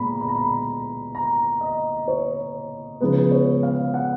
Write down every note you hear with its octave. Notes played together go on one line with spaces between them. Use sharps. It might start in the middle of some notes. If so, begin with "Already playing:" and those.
Already playing: A#2 G#3 B3 A#5 B5
B5
A#5
B5
A#5
D#5
C#5
C#3 F3 G#3 B3 B4
C#5
F5
F#5